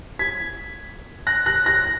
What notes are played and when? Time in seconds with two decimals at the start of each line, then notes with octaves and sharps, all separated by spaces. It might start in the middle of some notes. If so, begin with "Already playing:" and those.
0.19 G#6 B6
1.27 F#6 A#6
1.46 F#6 A#6
1.66 F#6 A#6